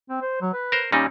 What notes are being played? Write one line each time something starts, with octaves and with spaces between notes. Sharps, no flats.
C4
C5
F#3
B4
A#4 C5
A#2 G3 C#4 D#4